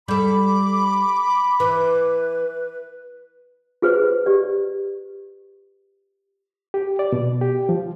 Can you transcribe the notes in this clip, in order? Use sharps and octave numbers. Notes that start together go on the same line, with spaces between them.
G3 A4 B5 D6
E3 B4
F4 G#4 B4 C5
G4 D5
G4
D5
B2
G4
F3